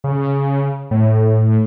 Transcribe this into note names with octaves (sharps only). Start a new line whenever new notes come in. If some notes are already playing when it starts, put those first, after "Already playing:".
C#3
A2